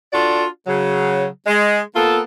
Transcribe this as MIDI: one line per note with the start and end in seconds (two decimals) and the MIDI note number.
0.13 0.46 62
0.13 0.46 65
0.13 0.46 66
0.13 0.46 69
0.13 0.46 74
0.67 1.26 49
0.67 1.26 54
1.47 1.80 56
1.95 2.20 58
1.95 2.20 59
1.95 2.20 65
1.95 2.20 69